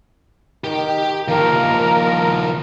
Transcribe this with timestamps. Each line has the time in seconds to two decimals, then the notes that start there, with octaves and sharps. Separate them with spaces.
0.64 D#3 G4 G5
1.28 D#3 F3 A#3 A#4